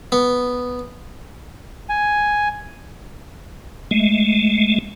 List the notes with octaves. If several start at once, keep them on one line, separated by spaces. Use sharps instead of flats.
B3
G#5
G#3 A3